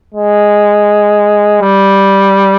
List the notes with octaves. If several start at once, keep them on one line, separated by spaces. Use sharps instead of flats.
G#3
G3